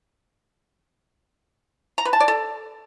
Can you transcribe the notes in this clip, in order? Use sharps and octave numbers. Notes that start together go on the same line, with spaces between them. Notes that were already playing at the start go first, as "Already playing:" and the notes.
A#5
B4
A5
D5
A4